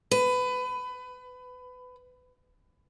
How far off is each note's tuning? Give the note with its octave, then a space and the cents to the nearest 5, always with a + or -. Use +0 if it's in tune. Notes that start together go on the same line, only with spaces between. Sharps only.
B4 +25